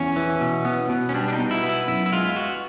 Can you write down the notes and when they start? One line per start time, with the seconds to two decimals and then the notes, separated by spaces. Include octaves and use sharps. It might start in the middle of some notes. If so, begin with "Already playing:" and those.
Already playing: E2 C#4
0.16 E3
0.41 B2
0.65 B3
0.89 B2
1.09 C#4
1.14 G3 D4
1.28 D4
1.33 D#4
1.39 B2
1.51 E4
1.63 B3
1.69 E4
1.88 F#2 E4
2.06 E4
2.12 G#3 F4
2.36 B3 F#4